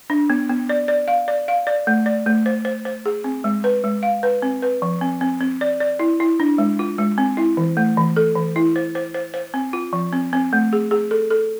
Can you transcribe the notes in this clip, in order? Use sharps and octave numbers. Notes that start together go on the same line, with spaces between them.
D4
B3
B3
D5
D5
F5
D5
F5
D5
A3
D5
A3
C5
C5
C5
G#4
C4
G#3
B4
G#3
F5
B4
C4
B4
F3
C4
C4
C4
D5
D5
E4
E4
D4
G#3
F4
G#3
C4
E4
E3
A3
E3
A4
E3
E4
C5
C5
C5
C5
C4
F4
F3
C4
C4
A3
G#4
G#4
A4
A4